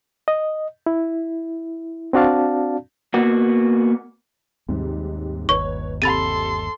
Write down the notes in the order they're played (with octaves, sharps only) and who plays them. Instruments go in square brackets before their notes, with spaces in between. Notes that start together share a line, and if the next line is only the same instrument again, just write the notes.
[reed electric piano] D#5
E4
C4 D4 F#4 D5 F5 A5
[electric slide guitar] A#3 B3 F#4
[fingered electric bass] D#2 [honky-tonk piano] G#2 C3 G3
[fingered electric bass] G1 D#2 [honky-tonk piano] B4 C#5 [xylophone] C#6
[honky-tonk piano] C3 [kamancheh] A4 C6 [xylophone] B5 A6 D#7